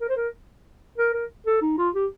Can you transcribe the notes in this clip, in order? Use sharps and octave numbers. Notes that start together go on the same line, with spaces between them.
A#4
C5
A#4
A#4
A#4
A4
D#4
F4
G4